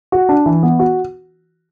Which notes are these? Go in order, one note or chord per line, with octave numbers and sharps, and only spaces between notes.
F#4
D4
E3
B3
F#4